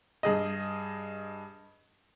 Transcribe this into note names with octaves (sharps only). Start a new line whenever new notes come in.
G2 G#4 D#5